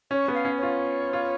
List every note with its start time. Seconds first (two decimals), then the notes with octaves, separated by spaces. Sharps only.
0.11 C#4 C#5
0.28 B3
0.34 F5
0.45 C#4
0.57 C#5
0.63 F4
1.13 F4